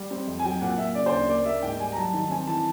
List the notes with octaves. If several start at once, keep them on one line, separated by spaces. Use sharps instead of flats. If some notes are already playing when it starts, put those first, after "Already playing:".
Already playing: G3
C4
F2
G#5
F#3 G5
A#2 F#5
A#2 E5
C#3 D5
C5
D2
D5
A#3 D5
A#3 E5
G#2 G5
G3 G#5
A#5
F#3 A5
D#3
C4 G#5
E3 A5